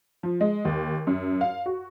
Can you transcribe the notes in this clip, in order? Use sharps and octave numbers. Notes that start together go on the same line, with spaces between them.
F3
G#3
D#2
F#2
F5
F#4